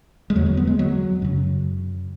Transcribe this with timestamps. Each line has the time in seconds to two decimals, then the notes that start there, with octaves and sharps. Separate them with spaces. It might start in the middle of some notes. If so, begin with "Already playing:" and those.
0.30 G#3
0.35 E2 F#3
0.39 D3
0.46 B3
0.57 B3
0.67 G#3
0.79 F#3
1.22 F#2 C#3